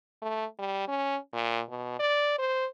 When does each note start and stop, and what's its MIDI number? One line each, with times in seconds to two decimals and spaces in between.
0.22 0.45 57
0.59 0.87 55
0.88 1.16 61
1.33 1.61 46
1.70 1.98 47
2.00 2.38 74
2.39 2.66 72